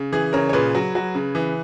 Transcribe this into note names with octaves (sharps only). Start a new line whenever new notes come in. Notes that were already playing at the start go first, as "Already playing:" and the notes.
Already playing: C#3
E3 G#4
C#3 A#4 C#5
C#5
A#2 G#4 B4
F#3
F#3
C#3
E3